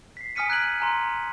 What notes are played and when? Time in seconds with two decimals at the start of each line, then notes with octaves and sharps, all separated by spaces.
0.17 B6 C7
0.35 G#5 D#6 F6 B6 C#7 D#7
0.49 A#5 F#6 G#6 D7 F#7
0.80 G#5 A#5 C6